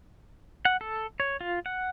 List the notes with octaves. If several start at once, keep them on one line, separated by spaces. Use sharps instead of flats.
F#5
A4
C#5
F4
F#5